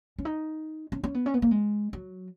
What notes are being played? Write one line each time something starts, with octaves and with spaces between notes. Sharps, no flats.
C#4
D#4
C#4
C#4
B3
C#4
B3
A#3
G#3
F#3